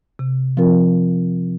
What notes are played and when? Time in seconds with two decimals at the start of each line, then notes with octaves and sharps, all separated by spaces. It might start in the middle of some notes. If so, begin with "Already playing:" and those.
0.19 C3
0.57 F3 C4 F4 A#4